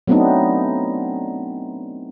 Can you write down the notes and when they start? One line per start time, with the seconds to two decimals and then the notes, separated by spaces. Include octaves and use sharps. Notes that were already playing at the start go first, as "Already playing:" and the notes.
0.07 F#3 A3 B3 C4 D4 D#4